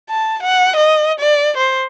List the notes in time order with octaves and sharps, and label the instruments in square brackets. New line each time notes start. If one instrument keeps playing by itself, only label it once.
[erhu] A5
F#5
D#5
D5
C5